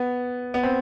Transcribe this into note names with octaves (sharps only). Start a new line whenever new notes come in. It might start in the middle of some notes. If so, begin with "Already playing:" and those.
Already playing: B3
B3
C4